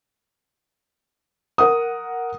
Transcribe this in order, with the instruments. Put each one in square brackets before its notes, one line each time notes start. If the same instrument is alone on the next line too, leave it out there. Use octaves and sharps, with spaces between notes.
[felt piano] A#4 F#5 D#6